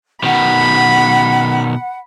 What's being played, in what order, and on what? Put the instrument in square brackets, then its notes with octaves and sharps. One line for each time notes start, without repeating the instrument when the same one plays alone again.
[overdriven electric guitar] B2 D#3 [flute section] F#5 [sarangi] B5